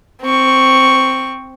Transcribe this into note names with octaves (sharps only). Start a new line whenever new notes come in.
C4 C#6